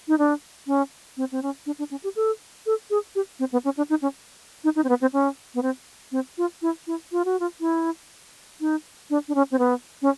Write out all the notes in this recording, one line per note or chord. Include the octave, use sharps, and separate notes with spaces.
D#4
D4
C#4
C4
C4
C#4
D4
D4
C#4
G4
A4
A4
G#4
G4
C4
B3
C#4
D4
D#4
C#4
D#4
D#4
C4
B3
C4
C#4
B3
C4
C4
F4
E4
E4
F4
F#4
F4
E4
D#4
D4
D4
C#4
C4
B3
C#4